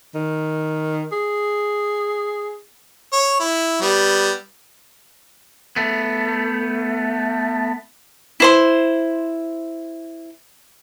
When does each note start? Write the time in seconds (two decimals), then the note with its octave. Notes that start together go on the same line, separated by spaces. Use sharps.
0.15 D#3
1.12 G#4
3.12 C#5
3.40 E4
3.81 G3 B3
5.76 A3 B3
8.40 E4 C5 C6